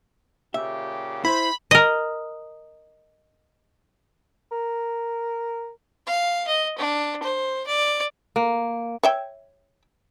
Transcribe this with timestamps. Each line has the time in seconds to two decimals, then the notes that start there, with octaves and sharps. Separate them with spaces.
0.54 A#2 C#3 G4 E5
1.25 E4 C5 B5
1.71 A#4 D#5
4.52 A#4
6.07 F5
6.48 D#5
6.79 D4
7.23 C5
7.67 D5
8.36 A#3
9.03 C#5 E5 G5